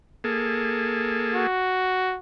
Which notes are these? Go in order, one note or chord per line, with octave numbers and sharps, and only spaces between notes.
A#3 G#4 A4
F#4